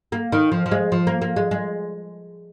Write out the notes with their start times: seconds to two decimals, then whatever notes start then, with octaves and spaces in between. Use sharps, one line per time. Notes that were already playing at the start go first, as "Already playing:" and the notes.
0.12 A#3
0.32 D#3
0.52 F3
0.66 F3
0.71 G#3
0.92 F3
1.07 A#3
1.22 A#3
1.36 G#3
1.51 G#3